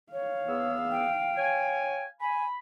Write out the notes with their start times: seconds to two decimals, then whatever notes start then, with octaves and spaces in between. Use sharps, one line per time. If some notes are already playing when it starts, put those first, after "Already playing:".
0.13 C#5 F5
0.48 E2 B3 E6
0.91 G5
1.37 C#5 G#5
2.21 G#5 B5